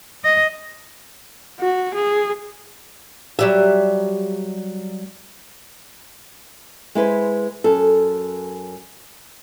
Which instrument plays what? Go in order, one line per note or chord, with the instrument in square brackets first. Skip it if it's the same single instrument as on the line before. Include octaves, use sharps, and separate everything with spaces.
[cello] D#5
[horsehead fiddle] F#4
G#4
[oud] F#3 G3 E5
[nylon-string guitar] G#3 E4 B4 C5
F#2 A4